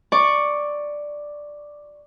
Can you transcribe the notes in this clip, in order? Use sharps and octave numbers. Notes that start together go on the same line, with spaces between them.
D5 C#6